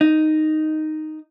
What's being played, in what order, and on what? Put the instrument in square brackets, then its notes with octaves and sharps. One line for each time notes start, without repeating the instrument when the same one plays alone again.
[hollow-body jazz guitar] D#4